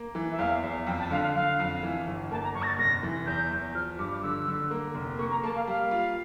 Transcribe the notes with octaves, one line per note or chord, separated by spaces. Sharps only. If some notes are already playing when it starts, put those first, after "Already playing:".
Already playing: A#3
E3
E5
E2 F5
E2
F2 G5
A5
D3 F5
F5
D3 F5
F2
E3
G1
A#3 A5
A#5
G1 C#6
A#6
A6
F1 A#6
E3
E2 G6
E2
F3 F6
G2 D6
D6
D3 E6
D3
A#3
F1
A#3 C#6
A#5
A#3 A5
F5
G3 F5
F4